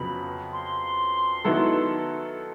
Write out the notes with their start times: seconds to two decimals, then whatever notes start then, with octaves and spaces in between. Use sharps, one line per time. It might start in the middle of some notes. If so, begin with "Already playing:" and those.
Already playing: F2 C#3 F#3 B3 B5
0.53 C6
1.44 D#3 F#3 B3 E4 A4